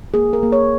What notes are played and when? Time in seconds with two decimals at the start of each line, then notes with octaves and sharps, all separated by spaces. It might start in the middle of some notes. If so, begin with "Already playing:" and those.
0.14 A#3 G#4
0.33 A#4
0.43 A#3
0.52 C#5